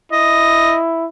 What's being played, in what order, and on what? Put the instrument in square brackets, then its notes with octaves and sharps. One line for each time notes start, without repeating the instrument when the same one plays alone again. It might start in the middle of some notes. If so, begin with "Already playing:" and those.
[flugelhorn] E4 [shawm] D#5